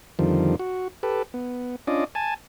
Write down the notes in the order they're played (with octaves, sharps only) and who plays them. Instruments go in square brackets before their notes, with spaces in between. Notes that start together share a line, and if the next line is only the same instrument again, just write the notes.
[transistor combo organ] F2 D3 D#3 F3 G3
F#4
G4 A4 B4
B3
C#4 D4 F4 D5 D#5
G#5 A5